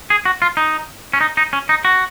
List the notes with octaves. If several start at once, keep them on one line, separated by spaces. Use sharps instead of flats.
G#4
F#4
F4
D#4
C#4
D#4
D#4
C#4
D#4
F#4